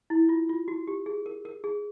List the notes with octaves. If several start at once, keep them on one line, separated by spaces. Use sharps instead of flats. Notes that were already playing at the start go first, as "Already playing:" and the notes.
E4
F4
F4
F#4
G4
G#4
A#4
A#4
G#4